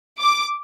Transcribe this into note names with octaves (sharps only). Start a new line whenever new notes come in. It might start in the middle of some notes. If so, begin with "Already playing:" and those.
D6